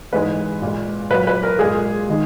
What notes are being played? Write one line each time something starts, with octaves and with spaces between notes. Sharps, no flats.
G#2 E3 G#3 B4
A#2 G#3
A#2 F#3 B4
B4
A#4
A#2 G#3 G#4
D#3 G#3